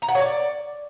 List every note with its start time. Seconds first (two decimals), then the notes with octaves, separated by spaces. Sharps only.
0.02 A#5
0.08 F#5
0.15 C#5
0.21 D5